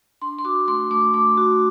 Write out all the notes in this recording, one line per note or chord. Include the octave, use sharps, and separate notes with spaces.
D4 C6
C6
F#4 D6
A3 C6
A3 D6
A3 D6
F#4